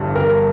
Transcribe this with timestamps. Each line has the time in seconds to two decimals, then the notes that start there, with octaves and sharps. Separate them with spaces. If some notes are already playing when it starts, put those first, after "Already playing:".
Already playing: G1 G2 E3
0.15 A#4